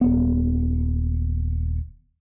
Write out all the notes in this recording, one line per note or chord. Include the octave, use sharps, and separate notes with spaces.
D#1 B3